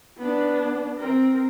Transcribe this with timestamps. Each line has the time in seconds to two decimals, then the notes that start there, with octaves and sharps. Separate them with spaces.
0.18 B3 D4
0.98 C4 A#4